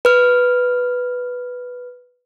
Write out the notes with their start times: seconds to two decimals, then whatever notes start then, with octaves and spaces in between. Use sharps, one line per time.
0.05 B4 F6